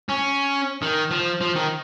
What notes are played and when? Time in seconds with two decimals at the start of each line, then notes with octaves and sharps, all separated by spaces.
0.09 C#4
0.82 D#3
1.11 F3
1.41 F3
1.55 D#3